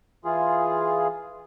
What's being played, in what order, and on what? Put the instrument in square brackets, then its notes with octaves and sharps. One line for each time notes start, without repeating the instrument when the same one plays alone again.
[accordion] E3 F4 G#4